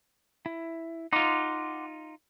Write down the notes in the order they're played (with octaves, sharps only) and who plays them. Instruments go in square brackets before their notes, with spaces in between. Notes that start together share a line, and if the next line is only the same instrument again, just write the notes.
[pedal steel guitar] E4
[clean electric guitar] D#4 F4 [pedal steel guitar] F#5 C6 D6